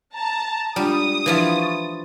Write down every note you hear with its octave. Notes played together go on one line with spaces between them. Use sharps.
A5 A#5
G3 G#3 D4 F4 D#6
E3 F3 D4 E4 F4
C#6 A6